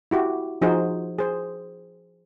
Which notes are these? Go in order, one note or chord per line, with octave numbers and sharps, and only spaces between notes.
E4 F#4 G4
F3 D#4 F#4 G#4 C5
G#4 C5